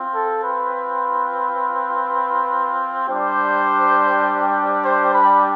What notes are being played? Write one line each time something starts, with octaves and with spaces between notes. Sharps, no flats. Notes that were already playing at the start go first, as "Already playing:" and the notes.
Already playing: C4 F4
A4
B4
G3 D4 G4 C5
C5
B5